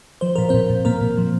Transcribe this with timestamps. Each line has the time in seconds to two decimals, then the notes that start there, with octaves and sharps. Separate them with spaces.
0.21 F3 C5
0.36 A#2 A#4
0.49 A#2 C4 C5
0.70 A#2
0.85 A#2 A#3 A#4
1.01 A#2
1.18 F3